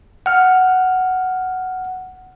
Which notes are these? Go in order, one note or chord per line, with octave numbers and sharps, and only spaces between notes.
F#5 F6